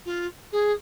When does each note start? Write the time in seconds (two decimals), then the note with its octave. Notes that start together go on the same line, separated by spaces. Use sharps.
0.05 F4
0.52 G#4